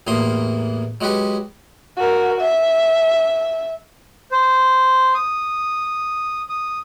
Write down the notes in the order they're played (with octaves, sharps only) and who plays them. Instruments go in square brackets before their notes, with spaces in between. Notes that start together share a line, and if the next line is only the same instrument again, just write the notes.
[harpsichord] A1 E2 E3 A#3 C6 D#6
F#3 G#3 F#4 G4 B4
[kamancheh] F#4 A#4
E5
[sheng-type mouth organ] C5
D#6
D#6